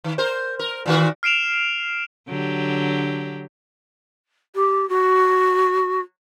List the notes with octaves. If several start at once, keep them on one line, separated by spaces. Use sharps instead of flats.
D#3
A#4 C5
A#4
A#2 D#3 F#4
F6 C7 D7 E7 F7
D3 F#3 G4
G4
F#4